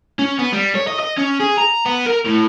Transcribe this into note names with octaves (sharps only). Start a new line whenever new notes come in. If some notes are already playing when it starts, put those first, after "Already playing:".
C#4
B3
G3
C#5
D#5
D#5
C#4
G#4
A#5
B3
A#4
A2